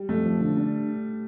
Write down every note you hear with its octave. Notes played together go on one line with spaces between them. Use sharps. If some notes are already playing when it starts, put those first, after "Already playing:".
Already playing: G3
F2 A3
F3
D3
D4